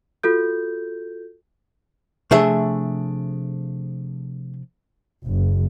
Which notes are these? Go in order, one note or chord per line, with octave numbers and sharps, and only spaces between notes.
F4 F#4 A4 G6
C3 F3 A3 D4 G#4 E5
F#1